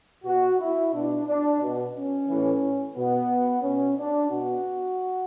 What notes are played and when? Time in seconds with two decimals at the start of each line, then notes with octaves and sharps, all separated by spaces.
0.25 B2 F#4
0.60 E4
0.93 B2 D4
1.27 D4
1.61 B2
1.95 C#4
2.28 A2 E3
2.95 B2 B3
3.63 B2 C#4
3.97 D4
4.30 B2 F#4